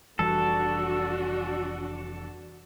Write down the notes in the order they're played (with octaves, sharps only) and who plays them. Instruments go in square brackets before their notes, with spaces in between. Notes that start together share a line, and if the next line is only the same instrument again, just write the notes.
[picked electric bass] F1 E3 G3 [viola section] D4 F#4 [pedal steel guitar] A4